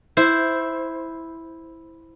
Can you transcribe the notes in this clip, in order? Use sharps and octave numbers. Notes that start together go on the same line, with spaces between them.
E4 C5